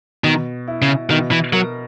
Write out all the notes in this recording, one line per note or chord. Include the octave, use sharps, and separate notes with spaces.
B2 D#3
E4
C#3
B2 D#3
E3
F#3 A#4